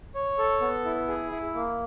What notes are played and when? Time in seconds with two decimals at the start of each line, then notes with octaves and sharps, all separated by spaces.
0.15 C#5
0.38 A4
0.61 B3
0.85 E4
1.08 G#4
1.31 E4
1.55 A#3